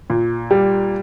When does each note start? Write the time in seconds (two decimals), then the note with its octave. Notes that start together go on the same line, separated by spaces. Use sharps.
0.10 A#2
0.51 G3